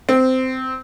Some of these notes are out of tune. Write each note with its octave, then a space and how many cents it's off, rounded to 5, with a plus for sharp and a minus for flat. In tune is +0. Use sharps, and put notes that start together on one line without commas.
C4 -15